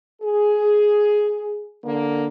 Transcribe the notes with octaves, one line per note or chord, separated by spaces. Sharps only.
G#4
D3 A#3